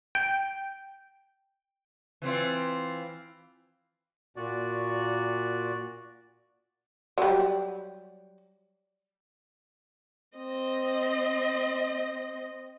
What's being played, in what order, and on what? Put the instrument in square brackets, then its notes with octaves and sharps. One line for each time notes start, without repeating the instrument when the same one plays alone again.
[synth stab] G5
[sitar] E3 C4 F4
[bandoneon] A#2 F#4 D5
[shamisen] F#3 G3
[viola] C4 D#5